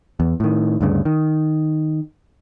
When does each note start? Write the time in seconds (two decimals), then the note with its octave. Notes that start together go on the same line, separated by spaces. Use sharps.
0.20 E2
0.40 A2 D#3
0.81 D2 G2 C#3
1.05 D#3